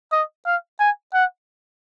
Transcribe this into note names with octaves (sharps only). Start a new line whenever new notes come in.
D#5
F5
G#5
F#5